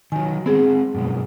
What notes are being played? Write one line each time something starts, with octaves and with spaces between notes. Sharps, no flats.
D#3 F#3 G#5
G#3 B3 C4 G#4
F#2 B2 G#3